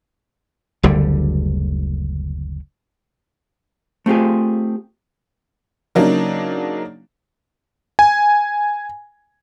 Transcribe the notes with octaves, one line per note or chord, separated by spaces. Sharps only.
F#1 D2 D3 G3
A3 C4 F4 G4 G#4
C#3 F#3 A#3 D4 D#4
G#5